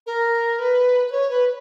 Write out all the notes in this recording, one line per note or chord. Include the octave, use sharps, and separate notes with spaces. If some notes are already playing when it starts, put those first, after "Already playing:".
A#4
B4
B4
C#5
B4